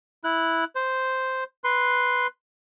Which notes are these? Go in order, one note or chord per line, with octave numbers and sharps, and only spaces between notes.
E4 F#6
C5
B4 C6